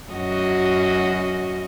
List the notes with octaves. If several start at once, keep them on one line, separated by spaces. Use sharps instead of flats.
F#2 F#4 D#5